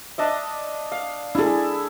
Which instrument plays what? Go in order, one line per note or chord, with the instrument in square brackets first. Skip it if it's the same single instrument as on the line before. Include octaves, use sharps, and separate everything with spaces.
[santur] D4 D#5 E5
F5
[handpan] D4 G#4 [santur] E4 A4